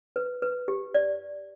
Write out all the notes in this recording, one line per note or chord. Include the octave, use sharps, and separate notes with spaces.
B4
B4
G4
D5